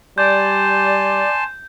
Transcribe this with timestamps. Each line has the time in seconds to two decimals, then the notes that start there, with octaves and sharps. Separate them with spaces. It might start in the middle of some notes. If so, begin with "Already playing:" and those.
0.18 G3 D5 G#5 A5 C6 G6